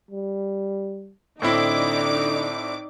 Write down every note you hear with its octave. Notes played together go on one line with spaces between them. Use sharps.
G3
A2 D3 C4 D#4 E4 D5 D6